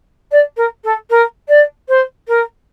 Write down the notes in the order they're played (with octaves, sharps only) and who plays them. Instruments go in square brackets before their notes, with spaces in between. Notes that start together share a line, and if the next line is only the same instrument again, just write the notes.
[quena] D5
A#4
A4
A#4
D5
C5
A#4